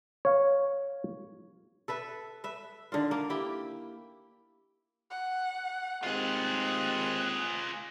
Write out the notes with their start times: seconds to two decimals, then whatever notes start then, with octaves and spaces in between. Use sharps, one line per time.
0.25 C#5 F5
1.88 A4 B4 E5
2.44 B4 E5
2.92 D3 D#3 F4
3.11 A#3
3.30 E4 G4 G5
5.10 F#5
6.03 D#2 G#3 C4 F4 G#4 F#6